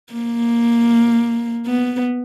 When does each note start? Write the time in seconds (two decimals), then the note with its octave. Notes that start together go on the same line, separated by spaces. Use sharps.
0.13 A#3
1.66 B3